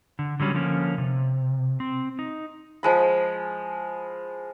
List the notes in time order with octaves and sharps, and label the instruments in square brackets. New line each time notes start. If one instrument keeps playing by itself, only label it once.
[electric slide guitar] D3
D3 F#3 G3 C#4
D3 F3 A#3 C#4
C3
C4
D#4
[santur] F3 G#3 B5